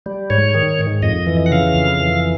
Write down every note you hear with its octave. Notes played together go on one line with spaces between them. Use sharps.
G3
G#2 C#5
D#3
G#2
F2 D#5
E3
F#5
C#3 F5
F2
E3